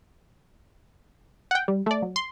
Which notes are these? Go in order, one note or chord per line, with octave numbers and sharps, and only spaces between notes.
F#5 G5
G3
A3 D5
F#3
C6